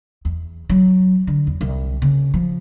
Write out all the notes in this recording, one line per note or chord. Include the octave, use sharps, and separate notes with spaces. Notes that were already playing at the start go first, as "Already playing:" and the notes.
E2
F#3
D3
E2
C2
C#3
F3